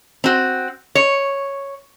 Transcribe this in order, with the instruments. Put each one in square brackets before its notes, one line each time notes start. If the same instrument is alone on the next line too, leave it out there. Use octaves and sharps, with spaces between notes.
[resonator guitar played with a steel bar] C4 F#4
C#5